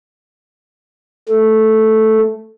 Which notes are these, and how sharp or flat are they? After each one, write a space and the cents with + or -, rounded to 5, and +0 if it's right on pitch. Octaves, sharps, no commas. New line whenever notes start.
A3 -5